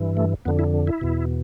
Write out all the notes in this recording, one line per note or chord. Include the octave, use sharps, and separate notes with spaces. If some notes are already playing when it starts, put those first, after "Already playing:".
Already playing: G2 E3
A3
F2 D3 B3
E4
E4
E2 B2